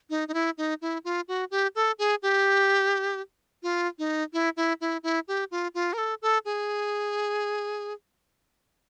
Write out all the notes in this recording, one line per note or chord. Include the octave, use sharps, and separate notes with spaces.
D#4
D#4
E4
D#4
E4
F4
F#4
G4
A4
G#4
G4
F4
D#4
E4
E4
E4
E4
G4
F4
F4
A#4
A4
A4
G#4